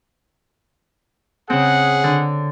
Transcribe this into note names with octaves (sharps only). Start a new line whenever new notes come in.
C#3 C4 G#4 F#5
D3